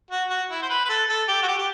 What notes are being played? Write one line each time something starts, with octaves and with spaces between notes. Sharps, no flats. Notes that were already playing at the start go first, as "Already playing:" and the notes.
F#4
F#4
E4
C5
B4
B4
A4
A4
G4
F#4
G4
G4